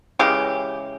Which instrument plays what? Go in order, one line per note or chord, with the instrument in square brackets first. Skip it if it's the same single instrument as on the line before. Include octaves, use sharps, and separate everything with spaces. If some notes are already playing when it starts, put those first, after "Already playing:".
[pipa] C#3 E3 G#3 G4